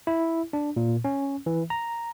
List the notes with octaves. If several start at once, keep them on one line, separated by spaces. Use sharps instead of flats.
E4
D4
A#2
C#4
E3
A#5